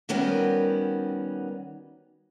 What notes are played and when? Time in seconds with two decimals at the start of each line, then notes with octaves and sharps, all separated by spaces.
0.09 D#3 G3 B3 C#4 F#4 A#4